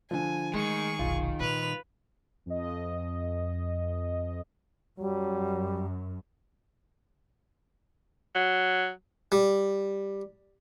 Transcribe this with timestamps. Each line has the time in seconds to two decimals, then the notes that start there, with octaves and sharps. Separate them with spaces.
0.11 D3 F3 G#5
0.54 D#3 G#3 A3 G#4 C#6
0.99 F1 B1 F4
1.40 A#2 G3 B4 F7
2.46 F2 D#5
4.99 F#2 F#3 G3
8.35 F#3
9.32 G3